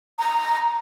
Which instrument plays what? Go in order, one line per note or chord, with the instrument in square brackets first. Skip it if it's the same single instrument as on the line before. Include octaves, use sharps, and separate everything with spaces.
[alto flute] A#5